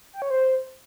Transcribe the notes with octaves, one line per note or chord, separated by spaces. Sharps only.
G5
C#5
C5